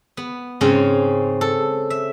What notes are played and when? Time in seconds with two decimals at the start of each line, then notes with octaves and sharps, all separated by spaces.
0.17 B3
0.61 G#2 C#3 C4 C#4
1.41 A4
1.90 E5